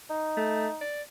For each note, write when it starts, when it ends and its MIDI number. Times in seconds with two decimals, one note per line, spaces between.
0.10 0.81 63
0.37 0.68 57
0.81 1.02 74